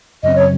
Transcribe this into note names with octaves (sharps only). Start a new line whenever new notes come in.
F#2 C#3 F#3 C4 D#5
C#5